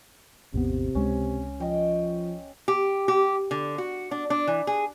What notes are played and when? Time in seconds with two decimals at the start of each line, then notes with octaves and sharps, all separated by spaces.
0.54 A1 E2 C3 B3
0.95 C#2 G#3 C#4
1.60 F3 D#5 G5
2.68 G4
3.08 G4
3.51 D3
3.78 F#4
4.11 D4
4.30 D4
4.47 E3
4.67 G#4